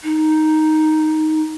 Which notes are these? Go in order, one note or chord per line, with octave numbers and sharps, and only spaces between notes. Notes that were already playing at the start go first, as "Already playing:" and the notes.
D#4